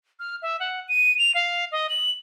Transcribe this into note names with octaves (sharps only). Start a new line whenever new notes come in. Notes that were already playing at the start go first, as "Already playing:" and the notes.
F6
E5
F#5
D#7
F7
F5
D#5
F#7